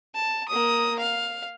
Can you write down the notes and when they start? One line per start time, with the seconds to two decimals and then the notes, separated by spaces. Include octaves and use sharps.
0.14 A5
0.48 A#3 D#6
0.99 F5